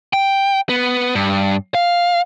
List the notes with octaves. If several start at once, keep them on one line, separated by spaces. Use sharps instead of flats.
G5
B3
G2
F5